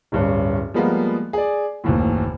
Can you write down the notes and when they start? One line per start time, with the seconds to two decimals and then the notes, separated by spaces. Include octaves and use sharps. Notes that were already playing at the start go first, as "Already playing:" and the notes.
0.12 D1 G2 C#4
0.74 F3 G3 G#3 A#3 B3 F4
1.33 G#4 D5
1.84 F#1 D#2 A2